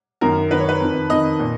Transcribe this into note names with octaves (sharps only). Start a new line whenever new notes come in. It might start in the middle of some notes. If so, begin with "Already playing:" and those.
F#2 D#3 A#4
F#2 D#3 B4
C#5
B4
F2 D#3
F2 D#3 D#5
A#2